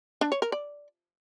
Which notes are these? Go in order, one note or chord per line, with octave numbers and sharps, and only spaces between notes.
D4
C#5
A#4
D5